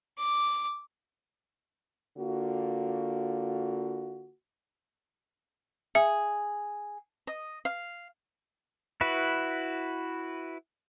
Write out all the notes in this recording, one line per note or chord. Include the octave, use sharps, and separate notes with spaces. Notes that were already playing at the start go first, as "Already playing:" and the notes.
D6
D3 A#3 F4 F#4
G#4 E5
D#5
F5
E4 F#4 B4